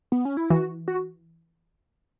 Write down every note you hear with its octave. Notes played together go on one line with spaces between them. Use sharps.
B3
C#4
E4
E3 F#4
F#4